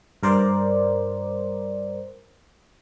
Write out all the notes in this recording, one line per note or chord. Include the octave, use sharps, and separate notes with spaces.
G2 A#4 C5 D5